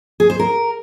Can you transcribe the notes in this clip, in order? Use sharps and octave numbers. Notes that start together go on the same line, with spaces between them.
G#4
C5
A#4